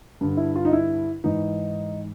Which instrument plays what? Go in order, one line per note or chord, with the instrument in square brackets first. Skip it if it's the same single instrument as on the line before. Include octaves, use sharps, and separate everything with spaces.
[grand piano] G2 D3
E4
F4
D#4
E4
G#2 E3 D#4